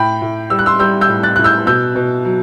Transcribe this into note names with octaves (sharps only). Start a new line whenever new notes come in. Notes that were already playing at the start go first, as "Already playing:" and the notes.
Already playing: A2 G5 B5
A2
G3 E6
F#6
C6 E6
G3 E6 G6
E6 G6
A2
F#6 A6
A2 F#6
E6 G6
B2 E6 G6
B2
F#3